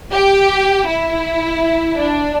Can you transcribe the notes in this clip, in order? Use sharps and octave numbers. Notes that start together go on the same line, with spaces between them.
G4
E4
D4